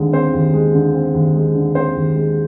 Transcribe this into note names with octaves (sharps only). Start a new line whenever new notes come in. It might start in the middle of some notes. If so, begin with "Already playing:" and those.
Already playing: D#2 D3 G#3 C4
C4 C5
D#2
G#3
D3
C4
D#2
G#3
D3
C4 C5
D#2
G#3